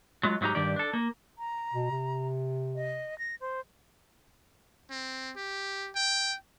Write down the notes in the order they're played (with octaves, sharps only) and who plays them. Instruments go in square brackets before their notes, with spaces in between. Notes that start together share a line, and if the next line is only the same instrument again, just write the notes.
[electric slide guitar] F#3 G#3 F4
G#2 F#3 G#3 D#4 G4 A#5
G2 D#3 D4 G4 D5
D4 A4
A#3
[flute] A#5
[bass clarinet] B2
C3
[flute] D#5
A#6
C5
[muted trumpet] C4
G4
G5